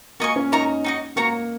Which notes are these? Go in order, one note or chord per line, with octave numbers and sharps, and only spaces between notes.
A#3 F#4 D#5 G#5 C#6
C#4
D#4 A#4 C#5 A#5 C#6
D#4 F#4 D#5
A#3 F#4 C#5 A#5